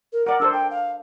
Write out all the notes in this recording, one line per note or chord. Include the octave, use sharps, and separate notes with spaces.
A#4
A#4 D5 F#5
D4 A4 C5 E6
G5
F5